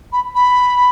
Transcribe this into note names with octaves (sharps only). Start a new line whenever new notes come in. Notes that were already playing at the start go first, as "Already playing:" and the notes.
B5
B5